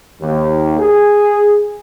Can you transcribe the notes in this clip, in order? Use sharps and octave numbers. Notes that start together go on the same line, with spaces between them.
D#2
G#4